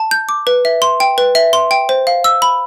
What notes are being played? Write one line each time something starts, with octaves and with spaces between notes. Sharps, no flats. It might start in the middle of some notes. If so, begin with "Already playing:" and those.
Already playing: A5
G6
D6
B4
E5
C6
G5
B4
E5
C6
G5
C5
F5
E6
B5